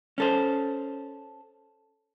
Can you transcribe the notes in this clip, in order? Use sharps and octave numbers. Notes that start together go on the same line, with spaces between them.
C#4 A4 C5